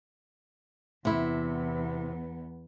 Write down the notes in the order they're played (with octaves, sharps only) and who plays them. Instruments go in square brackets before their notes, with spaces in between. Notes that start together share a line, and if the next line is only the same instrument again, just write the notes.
[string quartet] E2 B3 [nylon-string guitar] C3 E4